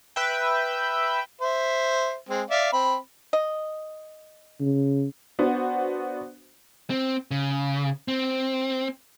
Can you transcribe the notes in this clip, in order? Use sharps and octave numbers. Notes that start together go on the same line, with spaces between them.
B4 E5 G5
C5 E5
G#3 C4
D5 E5 F5
C4 B5
D#5
C#3
B3 D4 F#4 C5
C4
C#3
C4